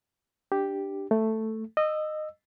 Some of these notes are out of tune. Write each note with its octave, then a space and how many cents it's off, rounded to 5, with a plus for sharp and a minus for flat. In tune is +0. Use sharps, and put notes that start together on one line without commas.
D4 +0 G4 +0
A3 +5 A4 +0
D#5 -15 E6 +0